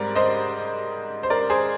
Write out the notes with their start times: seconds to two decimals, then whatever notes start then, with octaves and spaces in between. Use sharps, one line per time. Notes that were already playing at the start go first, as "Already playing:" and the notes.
Already playing: G#2 G3 C4 A#4 D5
0.15 C5 D#5
1.23 C5
1.30 A#4 D5
1.50 G#4 C5